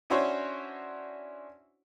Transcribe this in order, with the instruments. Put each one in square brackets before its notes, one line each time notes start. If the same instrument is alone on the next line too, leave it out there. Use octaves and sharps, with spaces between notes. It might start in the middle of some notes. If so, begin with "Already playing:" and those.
[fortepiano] C#4 D4 E4 F#4 C5 C#5